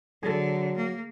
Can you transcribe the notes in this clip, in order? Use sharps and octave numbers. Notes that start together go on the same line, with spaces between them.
D3 F#3 G#4 A4
A#3